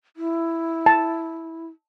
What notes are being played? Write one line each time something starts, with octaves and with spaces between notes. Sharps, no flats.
E4
A5